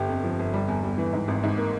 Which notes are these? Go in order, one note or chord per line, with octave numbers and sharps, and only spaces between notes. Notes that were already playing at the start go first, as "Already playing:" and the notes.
Already playing: G1 G4
F2
F3
G1
G3
E2
G3
E3
G#2
G#1
G#2
A#3